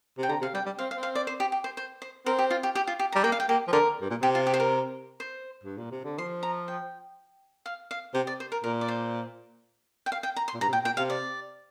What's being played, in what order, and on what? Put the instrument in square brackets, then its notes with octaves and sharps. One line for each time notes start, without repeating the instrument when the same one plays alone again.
[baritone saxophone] C3 [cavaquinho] G5
[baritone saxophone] D3 [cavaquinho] A#5
[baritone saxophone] C3 [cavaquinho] F5
[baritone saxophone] G3 [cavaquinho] G5
[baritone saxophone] G3
[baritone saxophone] C4 [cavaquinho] F5
[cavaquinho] F5
[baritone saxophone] C4
[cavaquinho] F5
D5
C5
G4
G4
C5
C5
C5
[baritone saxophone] C4 [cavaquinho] A#4
[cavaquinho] G4
F4
G4
G4
F4
G4
A#5
[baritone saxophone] G3
[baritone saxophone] A#3 [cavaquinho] G5
[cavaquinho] F5
G5
[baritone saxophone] A#3 [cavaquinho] G4
[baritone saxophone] F3
[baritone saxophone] D3 [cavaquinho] A#4
[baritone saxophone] G2
A#2
[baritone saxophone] C3 [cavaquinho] G4
[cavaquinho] F4
G4
C5
A#4
C5
[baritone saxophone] G2
A#2
C3
D3
[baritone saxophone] F3 [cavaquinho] C6
[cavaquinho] A#5
G5
F5
F5
[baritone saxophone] C3 [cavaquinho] G5
[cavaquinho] D5
C5
A#4
[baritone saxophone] A#2 [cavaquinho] A#4
[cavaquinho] D5
C5
G5
F5
G5
A#5
C6
[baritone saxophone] A#2
[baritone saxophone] G2 [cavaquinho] A#5
[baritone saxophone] C3
[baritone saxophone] A#2 [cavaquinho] G5
[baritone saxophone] A#2 [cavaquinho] G5
[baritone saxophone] C3 [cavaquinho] F5
[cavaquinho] D5